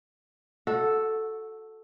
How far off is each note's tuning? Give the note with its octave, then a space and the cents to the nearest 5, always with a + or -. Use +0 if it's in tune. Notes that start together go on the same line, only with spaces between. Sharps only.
F#4 -10 A4 +0 F#5 -35